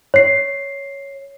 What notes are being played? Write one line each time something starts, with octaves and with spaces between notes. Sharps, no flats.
C#5 C7